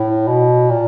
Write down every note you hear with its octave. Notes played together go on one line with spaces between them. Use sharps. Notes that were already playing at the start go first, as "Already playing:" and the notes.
Already playing: A2
B2
A#2